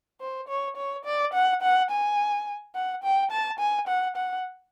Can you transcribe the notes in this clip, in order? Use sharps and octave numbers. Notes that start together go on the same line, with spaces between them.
C5
C#5
C#5
D5
F#5
F#5
G#5
F#5
G5
A5
G#5
F#5
F#5